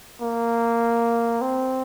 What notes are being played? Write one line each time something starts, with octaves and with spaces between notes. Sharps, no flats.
A#3
C4